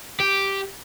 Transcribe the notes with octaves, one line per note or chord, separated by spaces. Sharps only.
G4